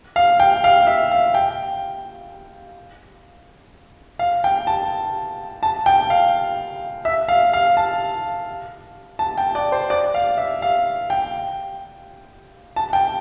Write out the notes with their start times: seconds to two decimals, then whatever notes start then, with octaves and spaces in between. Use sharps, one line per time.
0.16 F5
0.40 G5
0.64 F5
0.87 E5
1.11 F5
1.34 G5
4.19 F5
4.44 G5
4.67 A5
5.63 A5
5.86 G5
6.10 F5
7.05 E5
7.28 F5
7.53 F5
7.77 A5
9.19 A5
9.38 G5
9.55 D5
9.72 C5
9.90 D5
10.14 F5
10.38 E5
10.62 F5
11.10 G5
12.76 A5
12.93 G5